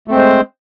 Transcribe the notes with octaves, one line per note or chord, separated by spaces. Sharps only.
G#3 A3 C4 C5